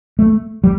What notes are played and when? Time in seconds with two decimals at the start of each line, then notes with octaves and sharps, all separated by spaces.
0.19 A3
0.64 G3